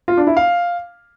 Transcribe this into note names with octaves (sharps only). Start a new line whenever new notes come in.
F4
D4
E4
F5